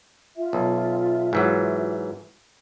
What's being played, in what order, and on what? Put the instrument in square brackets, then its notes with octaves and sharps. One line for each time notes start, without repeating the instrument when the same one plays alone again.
[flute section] F4 E5
[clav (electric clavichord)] B1
G#2 E3 F#3